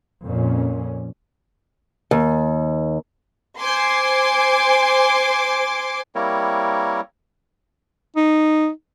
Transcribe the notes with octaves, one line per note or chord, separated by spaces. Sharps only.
F2 A#2 C#4
D#2
C5 G#5 C6 D6
G3 A#3 C4 E4 A#4 C#5
D#4